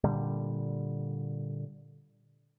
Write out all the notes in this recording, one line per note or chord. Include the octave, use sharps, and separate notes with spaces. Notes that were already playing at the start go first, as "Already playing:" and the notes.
A#2 D3 G3